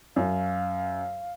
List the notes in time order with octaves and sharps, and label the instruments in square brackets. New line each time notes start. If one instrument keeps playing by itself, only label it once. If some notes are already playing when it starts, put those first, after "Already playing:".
[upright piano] F#2 [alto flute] F5